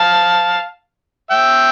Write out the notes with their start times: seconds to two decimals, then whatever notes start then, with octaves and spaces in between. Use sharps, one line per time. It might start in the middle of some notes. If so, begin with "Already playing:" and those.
Already playing: F5 A5
1.31 E5 G5